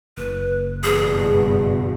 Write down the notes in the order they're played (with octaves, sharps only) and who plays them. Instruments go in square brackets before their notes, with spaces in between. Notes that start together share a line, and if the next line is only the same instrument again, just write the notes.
[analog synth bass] F#1 [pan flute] B4
[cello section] E2 G2 B2 [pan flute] G#4